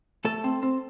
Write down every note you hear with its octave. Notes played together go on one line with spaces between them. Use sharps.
A3 A4 A5
C4
C4